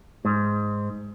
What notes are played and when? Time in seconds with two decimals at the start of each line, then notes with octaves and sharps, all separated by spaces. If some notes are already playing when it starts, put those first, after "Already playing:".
0.25 G#2